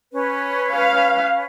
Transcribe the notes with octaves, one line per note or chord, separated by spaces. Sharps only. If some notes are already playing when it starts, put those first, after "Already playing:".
C#4 B4
F5